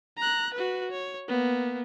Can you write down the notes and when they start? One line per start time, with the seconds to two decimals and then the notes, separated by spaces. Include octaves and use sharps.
0.18 A#5 F#6
0.54 F#4 B4
0.91 C#5
1.28 A#3 B3